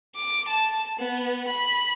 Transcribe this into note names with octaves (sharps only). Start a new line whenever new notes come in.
D6
A5
B3
B5